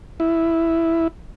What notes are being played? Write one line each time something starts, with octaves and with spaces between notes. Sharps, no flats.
E4